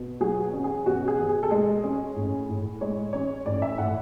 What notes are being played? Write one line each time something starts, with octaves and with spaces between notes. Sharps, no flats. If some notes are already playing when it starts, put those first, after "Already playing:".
Already playing: B2
F#3 G#4
C#4
G#4
B2 F#4
G#4
B2
G#4
A4
G#3 G#4
C#4
A2
A2
G#3 C#5
C#4 C#5
A2 D5
E5
A2 F#5